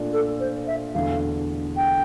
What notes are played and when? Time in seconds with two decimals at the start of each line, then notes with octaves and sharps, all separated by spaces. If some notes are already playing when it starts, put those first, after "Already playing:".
Already playing: A#2 A3 D4 F4
0.12 A4
0.40 C5
0.67 E5
0.94 E1 E2 D3 A3 F5
1.76 G5